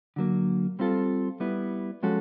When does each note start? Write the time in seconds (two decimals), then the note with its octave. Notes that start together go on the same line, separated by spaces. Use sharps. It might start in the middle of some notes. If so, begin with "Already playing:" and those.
0.16 D3 F#3 A#3
0.79 G3 C4 F4 A4
1.40 G3 B3 E4
2.03 F3 G#3 C#4 F#4 A4